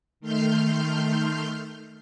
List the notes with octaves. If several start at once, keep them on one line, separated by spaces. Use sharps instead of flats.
D#3 A3 C6 F6 G6